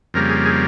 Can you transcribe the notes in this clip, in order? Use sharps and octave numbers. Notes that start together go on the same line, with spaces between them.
F2 C#3 G3 A#3 A#4
G#4
G#4